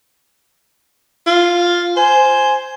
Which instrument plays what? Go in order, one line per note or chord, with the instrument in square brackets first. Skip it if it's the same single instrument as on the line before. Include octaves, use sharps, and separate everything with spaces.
[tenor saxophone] F4
[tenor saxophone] C5 [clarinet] G#5